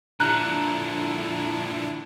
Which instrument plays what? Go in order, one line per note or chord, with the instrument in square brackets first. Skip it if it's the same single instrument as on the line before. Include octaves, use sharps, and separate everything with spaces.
[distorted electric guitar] A#2 D3 [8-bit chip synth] D4 E4 [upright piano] A#5 F#6